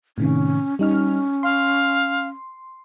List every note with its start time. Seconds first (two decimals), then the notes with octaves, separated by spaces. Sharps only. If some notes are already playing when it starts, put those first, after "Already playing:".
0.18 A2 C3 D#3 C#4
0.79 G3 C#4 D#4 F6
1.43 F5 C6